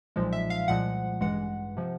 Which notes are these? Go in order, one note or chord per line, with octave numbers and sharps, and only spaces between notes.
B1 A#2 F3 G#3
E5
F5
C2 A#2 F3 G#3 F#5
A1 G2 E3 G#3 F#5
C3 F3